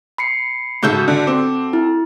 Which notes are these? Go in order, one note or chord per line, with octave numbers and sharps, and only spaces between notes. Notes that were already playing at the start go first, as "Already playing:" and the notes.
B5 C7 C#7
G#2 C#3 F#4 A4 E5 G6
D3
C4 D6
E4